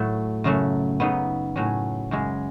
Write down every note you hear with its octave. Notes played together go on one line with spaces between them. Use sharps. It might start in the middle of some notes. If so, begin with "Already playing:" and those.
Already playing: A2 F#3 A3
F#2 C#3 F#3 A3
C#3 F#3 B3 D#4
A2 F#3 C#4
F#2 C#3 G#3